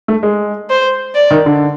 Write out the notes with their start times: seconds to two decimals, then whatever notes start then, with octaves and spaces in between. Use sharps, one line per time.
0.08 A3
0.23 G#3
0.70 C5
1.15 D5
1.31 D#3
1.46 D3